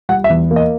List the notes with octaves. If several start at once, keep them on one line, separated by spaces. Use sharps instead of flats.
G3 F#5
E5
E2
A#3
D#5